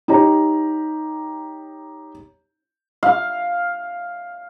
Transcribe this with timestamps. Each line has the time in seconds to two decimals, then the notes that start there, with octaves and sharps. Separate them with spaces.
0.08 D#4 G4 C#5 A#5
3.03 F5